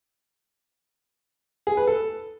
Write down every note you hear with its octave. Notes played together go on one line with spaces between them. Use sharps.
G#4
B4
A4